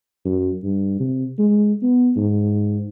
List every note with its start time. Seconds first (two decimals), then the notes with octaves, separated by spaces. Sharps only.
0.25 F#2
0.63 G2
1.00 C3
1.39 G#3
1.83 B3
2.16 G#2